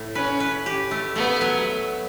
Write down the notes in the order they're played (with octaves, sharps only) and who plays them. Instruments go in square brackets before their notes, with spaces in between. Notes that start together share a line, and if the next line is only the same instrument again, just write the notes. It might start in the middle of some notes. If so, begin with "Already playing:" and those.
Already playing: [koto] A2
[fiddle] C#4 [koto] B4
[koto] B4
G4
A3
[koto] A3 [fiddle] B3
[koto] F#3